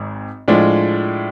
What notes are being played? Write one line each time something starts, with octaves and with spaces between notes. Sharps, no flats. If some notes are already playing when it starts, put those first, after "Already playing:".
Already playing: G#1 G#2
A2 F3 G#3 D4 F4